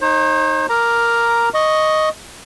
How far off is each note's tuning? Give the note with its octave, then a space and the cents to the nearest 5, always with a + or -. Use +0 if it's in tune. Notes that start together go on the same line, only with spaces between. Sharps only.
D#4 +0 C5 +45
A#4 +0 A#5 +0 D6 +0
D#5 +0 C#6 +0